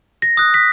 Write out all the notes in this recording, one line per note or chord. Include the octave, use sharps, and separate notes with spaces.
A#6
D#6 F#6
B6